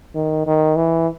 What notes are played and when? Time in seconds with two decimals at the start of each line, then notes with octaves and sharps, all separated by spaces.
0.15 D#3
0.47 D#3
0.76 E3